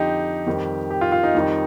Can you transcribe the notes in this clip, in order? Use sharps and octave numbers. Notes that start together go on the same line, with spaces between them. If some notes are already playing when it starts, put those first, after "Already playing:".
Already playing: F2 D3 F3 D#4 G4
F2 D#3 G3
G4
F4
F4
D#4
F2 D#3 G3